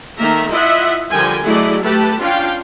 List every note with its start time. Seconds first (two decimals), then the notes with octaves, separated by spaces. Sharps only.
0.18 D#3 A3 A#3 E5 A#5
0.49 E4 F4 D#5 E5 F#5
1.10 D3 F3 G3 A#4 G5 G#5
1.44 F#3 A3 E4 G#4 D5 D#5
1.82 A3 G4 B4 A5
2.20 C#4 D4 F4 F5 G5